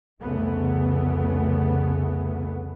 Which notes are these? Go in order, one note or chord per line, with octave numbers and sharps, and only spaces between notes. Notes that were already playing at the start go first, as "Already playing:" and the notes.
C2 F2 C#3 E3 A3 B3